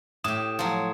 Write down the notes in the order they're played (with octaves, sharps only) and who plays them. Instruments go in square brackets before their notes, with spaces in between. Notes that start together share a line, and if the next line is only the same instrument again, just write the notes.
[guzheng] A2 G4 [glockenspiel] D#6 E7
[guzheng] F3 F#3